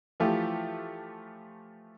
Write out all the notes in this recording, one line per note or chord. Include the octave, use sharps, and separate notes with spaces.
E3 F3 A3 F4 G4